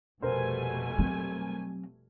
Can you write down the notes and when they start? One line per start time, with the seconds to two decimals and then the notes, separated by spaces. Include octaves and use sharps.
0.22 F1 B2 G3 A3 A#4 C5 G#5
0.98 F#3 C4